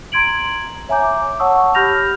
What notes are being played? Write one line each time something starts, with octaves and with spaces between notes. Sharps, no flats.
A#5 C6 G#6 D7 F#7
C#5 E5 G#5 A#5 D6 G6
D6
C#5 F#5 A5 C#6 D#6 E6
G4 B5 F6 G6 A#6 F7